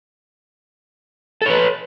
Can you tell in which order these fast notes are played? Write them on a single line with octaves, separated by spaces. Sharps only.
A4 C#5 B4